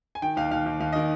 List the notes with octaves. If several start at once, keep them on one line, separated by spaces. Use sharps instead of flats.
G#5
D#3 G5
D#2 F5
D#2 F5
D#2
D#2 F5
D#3 D#5